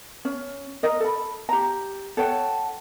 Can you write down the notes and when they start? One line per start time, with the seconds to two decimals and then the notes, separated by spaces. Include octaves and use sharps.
0.25 C#4
0.83 A#4 D#5
1.00 A4 B5
1.49 G4 A#5
2.17 A4 C#5 F#5 G5